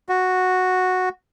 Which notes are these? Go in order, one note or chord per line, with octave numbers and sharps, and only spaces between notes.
F#4